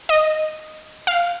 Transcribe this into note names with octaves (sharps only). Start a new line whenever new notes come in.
D#5
F5